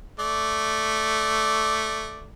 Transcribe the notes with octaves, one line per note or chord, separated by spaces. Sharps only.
A3 D5